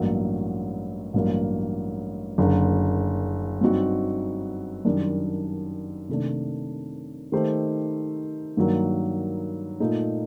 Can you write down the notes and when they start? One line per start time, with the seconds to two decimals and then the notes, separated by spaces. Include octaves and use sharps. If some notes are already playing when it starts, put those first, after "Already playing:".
Already playing: A1 G2 F#3 A#3
1.14 A1 G2 F#3 A#3
2.38 F#1 F#2 D3
3.61 G2 F#3 C4 D#4 F#4
4.85 F#2 D#3 G3 D4
6.09 C3 D#3 A3 D4
7.32 D#3 A3 D#4 G4 C5
8.57 G2 D#3 F#3 A#3
9.80 A#2 A3 D#4